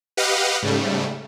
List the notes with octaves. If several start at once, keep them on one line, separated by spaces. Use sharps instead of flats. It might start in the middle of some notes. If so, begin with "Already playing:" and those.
G4 B4 D#5 F5 F#5
G#2 C#3 G3 A3